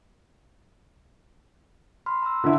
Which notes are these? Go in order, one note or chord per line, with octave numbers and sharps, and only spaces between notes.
B5 C6 F6
A#5 C6 E6
D3 C#4 E4